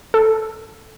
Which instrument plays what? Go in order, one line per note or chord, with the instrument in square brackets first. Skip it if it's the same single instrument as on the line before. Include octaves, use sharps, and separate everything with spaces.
[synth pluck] A4